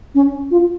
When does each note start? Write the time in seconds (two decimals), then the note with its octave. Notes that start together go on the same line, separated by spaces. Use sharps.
0.15 C#4
0.51 F4